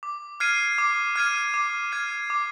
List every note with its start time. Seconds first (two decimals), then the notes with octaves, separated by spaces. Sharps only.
0.03 D6
0.40 F6 G#6 C7 D#7
0.78 D6
1.16 F6 G#6 C7 D#7
1.54 D6
1.92 F6 G#6 C7 D#7
2.30 D6